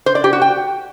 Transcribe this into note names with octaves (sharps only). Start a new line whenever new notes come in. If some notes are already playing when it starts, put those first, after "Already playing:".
C5
D5
G4
F#4
G5